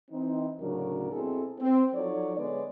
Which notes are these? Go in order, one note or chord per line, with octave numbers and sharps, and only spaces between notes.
E3 C4 D#4
D2 A2 C#3 F#3 D4 A#4
B2 C4 E4 G#4 A4
C4
F3 F#3 D#4 A4 C#5 D5
D3 G#3 B3 B4 C#5 D5